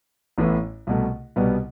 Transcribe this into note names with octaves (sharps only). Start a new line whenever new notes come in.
A1 A2 E3 B3 E4
C2 B2 A3
C2 B2 G3 B3